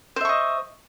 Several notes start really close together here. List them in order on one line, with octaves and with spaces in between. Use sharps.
C5 E5 C#6 D#5